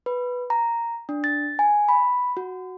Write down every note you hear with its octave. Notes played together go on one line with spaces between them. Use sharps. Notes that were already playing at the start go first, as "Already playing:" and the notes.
B4
A#5
D4
A6
G#5
B5
F#4